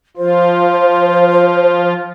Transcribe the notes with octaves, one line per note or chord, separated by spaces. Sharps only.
F3 F4 C5